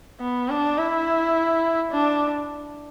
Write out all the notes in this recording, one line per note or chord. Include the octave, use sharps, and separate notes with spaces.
B3
D4
E4
D4